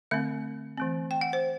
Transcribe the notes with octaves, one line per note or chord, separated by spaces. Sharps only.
D3 A3 C4 E5
E3 A3 C4
G5
F#5
C5